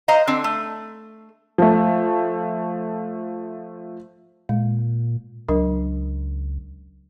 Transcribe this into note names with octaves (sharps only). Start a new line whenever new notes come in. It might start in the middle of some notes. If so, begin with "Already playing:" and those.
C5 D#5 F5 A#5
D3 C4 D4
A3
F3 A3
A#2 G#3
C#2 F#3 D4 A#4